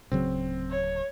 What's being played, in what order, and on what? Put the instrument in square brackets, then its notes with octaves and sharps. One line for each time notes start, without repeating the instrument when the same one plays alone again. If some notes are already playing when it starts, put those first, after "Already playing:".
[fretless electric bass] D1 C#3 F#3 [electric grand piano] C4
[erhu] C#5